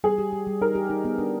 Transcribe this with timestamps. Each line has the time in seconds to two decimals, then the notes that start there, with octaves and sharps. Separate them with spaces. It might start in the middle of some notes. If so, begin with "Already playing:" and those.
0.04 G3 G#4
0.18 G4
0.33 G4
0.47 G3
0.61 D#4 A#4
0.75 G4
0.90 D#4
1.05 B3
1.18 D4